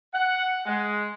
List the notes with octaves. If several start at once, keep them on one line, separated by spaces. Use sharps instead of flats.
F#5
G#3